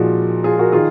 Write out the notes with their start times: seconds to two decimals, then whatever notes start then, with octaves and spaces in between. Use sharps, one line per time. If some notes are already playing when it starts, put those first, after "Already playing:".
Already playing: A#2 F3 G#3 D#4 F#4
0.44 F4 G#4
0.59 F#4 A#4
0.72 D#3 F4 G#4